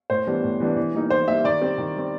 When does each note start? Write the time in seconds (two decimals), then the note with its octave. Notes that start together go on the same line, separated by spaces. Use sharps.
0.10 A2 C5
0.27 E3 G3 B3 D4
0.44 A2
0.60 E3 G3 B3 D4
0.77 E3
0.94 G3 A#3 D#4
1.10 E3 C5
1.28 G3 A#3 D#4 E5
1.44 D#3 D5
1.61 G3 C4
1.78 D#3
1.96 G3 C4